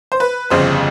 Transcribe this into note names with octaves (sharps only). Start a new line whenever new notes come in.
C5
B4
G1 F2 C#3 C5